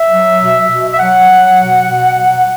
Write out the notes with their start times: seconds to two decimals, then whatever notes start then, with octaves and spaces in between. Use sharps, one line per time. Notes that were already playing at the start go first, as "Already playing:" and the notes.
Already playing: E5
0.08 F#3
0.38 B2
0.69 B2
0.93 E5
0.98 F#3 F#5
1.29 F#3
1.59 B2
1.89 B2
2.19 F#3